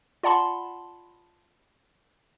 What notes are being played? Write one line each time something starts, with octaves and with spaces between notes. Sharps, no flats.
F4 D5 F#5 A5 B5 C6